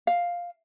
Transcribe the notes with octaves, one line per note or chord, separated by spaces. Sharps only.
F5